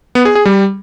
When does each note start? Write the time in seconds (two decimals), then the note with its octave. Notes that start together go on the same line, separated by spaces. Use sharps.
0.15 B3
0.25 G#4
0.35 G#4
0.45 G3